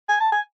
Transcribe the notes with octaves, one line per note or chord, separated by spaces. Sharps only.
G#5
A5
G#5